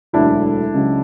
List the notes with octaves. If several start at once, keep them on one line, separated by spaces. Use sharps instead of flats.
E1 D2 D3 F#3 D4 E4
C#2 C#3 F#3